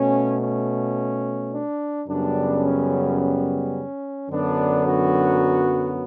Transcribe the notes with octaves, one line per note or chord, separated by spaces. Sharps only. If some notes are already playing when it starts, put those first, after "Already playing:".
Already playing: B2 A3 C#4
C#4
D4
F#2 C#3 G3 B3 D4
C#4
C#4
F#2 D3 F#3 B3 D4
F#4